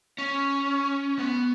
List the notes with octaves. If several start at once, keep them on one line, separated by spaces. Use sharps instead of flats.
C#4
B3